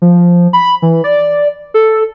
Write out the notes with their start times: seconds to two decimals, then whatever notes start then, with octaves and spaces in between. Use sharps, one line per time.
0.02 F3
0.53 B5
0.82 E3
1.04 D5
1.74 A4